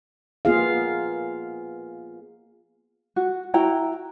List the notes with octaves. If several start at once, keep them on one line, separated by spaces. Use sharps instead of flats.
A#3 B3 F4 G#4 F5
F#4
E4 F#4 G5 A#5